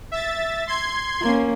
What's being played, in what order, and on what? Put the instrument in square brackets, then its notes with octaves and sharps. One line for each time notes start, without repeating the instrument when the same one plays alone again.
[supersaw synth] E5 A6
C6 G#6
[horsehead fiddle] A#3 C#4